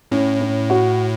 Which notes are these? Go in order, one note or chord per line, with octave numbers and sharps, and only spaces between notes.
A2 C#4
C#4
F#4